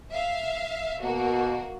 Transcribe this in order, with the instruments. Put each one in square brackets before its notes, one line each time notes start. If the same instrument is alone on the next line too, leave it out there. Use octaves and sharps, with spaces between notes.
[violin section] E5 F5
[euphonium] B2 [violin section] A#3 F#4